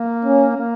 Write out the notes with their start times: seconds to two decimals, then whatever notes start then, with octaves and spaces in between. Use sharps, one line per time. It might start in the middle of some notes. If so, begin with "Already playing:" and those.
Already playing: A#3
0.25 C#4
0.56 A#3